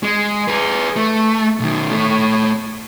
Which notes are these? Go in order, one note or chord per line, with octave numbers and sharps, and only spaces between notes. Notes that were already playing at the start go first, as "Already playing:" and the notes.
G#3
G#4 B4
A3
B1 D#3
A3 C#5